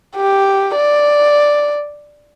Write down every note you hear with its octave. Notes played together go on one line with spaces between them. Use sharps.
G4
D5